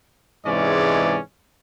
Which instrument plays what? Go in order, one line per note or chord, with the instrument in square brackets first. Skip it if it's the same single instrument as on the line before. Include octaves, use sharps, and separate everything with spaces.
[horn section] G#2 C3 E3 G#3 C#4 D5